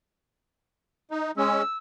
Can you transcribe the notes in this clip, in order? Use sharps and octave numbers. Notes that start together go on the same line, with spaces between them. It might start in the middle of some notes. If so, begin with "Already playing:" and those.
D#4
G#3 C#4 E6